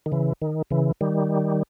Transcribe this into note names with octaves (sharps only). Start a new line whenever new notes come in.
D#3
C#3 E3
D#3
C#3 E3
D#3 G3